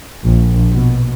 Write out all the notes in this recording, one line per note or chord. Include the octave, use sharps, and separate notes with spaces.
A#1
B2